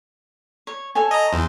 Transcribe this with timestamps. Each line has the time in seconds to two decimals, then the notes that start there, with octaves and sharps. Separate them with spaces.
0.67 C#5
0.95 A4 C#5 G#5
1.11 D#5 A#5
1.33 E2 C5